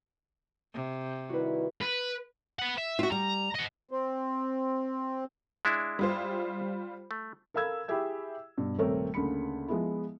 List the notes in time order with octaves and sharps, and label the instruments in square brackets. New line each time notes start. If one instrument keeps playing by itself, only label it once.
[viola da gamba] C3
[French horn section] D#3 G3 E4 [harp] F#4 B4
[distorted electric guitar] B4
B4 F#5
E5
[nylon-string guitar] F4 F#4
[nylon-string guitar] G3 [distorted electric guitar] A#5
[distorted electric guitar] D#5 F#5
[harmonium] C4
[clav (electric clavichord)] G#3 D4 E4
[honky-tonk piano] G3 F4 C5
[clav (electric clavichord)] A3
[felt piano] A4 A#4 F5 B5 E6 G#6
E4 G4 G#4 E5 G#6
G2 B2
D#1 C3 A3 C4 A#4 C#5
D2 C#3 A#3 B5 C#7
F3 G#3 B3 E4